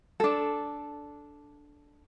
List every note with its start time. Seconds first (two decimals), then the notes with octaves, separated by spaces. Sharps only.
0.20 D4 A4